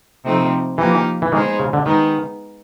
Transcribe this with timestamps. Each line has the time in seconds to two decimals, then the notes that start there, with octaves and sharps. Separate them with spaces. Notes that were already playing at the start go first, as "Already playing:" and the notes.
0.25 C3 F3 A3 C4 D#4
0.78 E3 F3 A#3 D#4 G4
1.22 E3
1.32 D#3 G#3 B3 D#4 G#4 C5
1.60 C#3
1.73 D3
1.86 D#3 G#3 B3 D#4